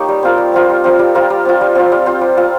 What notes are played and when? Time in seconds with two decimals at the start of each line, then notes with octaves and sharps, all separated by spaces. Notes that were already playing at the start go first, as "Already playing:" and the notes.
Already playing: A#3 D#4 G4 C#5
0.08 G3
0.23 C4 F4 A#4
0.38 G3
0.54 C4 F4 A#4
0.70 G3
0.84 C4 F4 A#4
0.99 G3
1.15 C4 F4 A#4
1.30 G3
1.45 C4 F4
1.61 G3
1.75 C4 F4
1.92 G3
2.06 C4 F4
2.21 G3
2.37 C4 F4